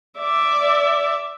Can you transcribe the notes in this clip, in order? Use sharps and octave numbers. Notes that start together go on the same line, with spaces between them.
D5 E5